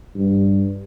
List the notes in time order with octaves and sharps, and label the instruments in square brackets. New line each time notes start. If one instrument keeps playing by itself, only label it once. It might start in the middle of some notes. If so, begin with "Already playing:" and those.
[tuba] G2